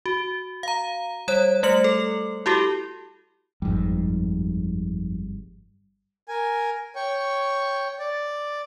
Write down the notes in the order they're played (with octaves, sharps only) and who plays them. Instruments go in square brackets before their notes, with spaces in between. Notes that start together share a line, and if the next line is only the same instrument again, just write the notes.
[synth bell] F#4
F5 A#5
G3 C#5 F#6
G3 A3 C#7 F#7
A4
E4 F#4 G4 A4
[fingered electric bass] G1 G3 [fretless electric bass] F2 G#2
[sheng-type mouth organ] A#4 G#5
C#5 G5 C#6
D5